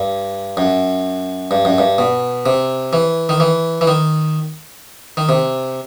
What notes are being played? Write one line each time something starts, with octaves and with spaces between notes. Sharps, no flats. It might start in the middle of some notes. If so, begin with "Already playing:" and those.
Already playing: G2
F#2
G2
F#2
G2
B2
C3
E3
D#3
E3
E3
D#3
D#3
C3